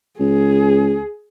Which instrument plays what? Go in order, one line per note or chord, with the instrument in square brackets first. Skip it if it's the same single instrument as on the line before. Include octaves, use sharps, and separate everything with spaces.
[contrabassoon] C#2 [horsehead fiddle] G#4